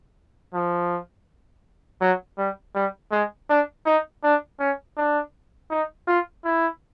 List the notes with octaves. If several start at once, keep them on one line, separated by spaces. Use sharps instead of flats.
F3
F#3
G3
G3
G#3
D4
D#4
D4
C#4
D4
D#4
F4
E4